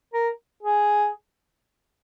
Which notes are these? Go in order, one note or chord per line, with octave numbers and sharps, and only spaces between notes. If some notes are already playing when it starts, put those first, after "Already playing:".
A#4
G#4